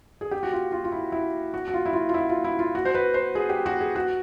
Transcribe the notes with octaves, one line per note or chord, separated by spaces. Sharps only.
G#4
G4
F#4
F4
F4
F4
E4
E4
F#4
F#4
F4
E4
F4
F4
E4
F4
E4
F4
F#4
C5
B4
C5
G#4
G4
F#4
G#4
F#4